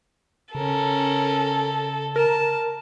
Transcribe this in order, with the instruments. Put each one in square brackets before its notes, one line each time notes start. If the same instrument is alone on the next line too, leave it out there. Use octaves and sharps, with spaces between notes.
[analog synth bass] C#3 [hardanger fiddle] C#4 A#4 [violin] A4
[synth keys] A#4 [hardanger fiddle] A5